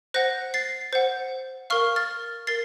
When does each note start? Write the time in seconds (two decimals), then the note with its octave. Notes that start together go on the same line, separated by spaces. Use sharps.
0.14 C5 F#5 F#6 A#6
0.54 A6 C7
0.93 C5 F#5
1.70 A#4 F5 C#6 F6
1.96 F6 A6
2.47 A#4 A6 C7